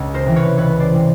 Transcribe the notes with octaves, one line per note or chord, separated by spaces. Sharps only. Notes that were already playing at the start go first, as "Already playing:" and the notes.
Already playing: C#2
A#4 C5
C3 E3
B4 C#5
C#2 B4 C#5
C5 D5
C3 E3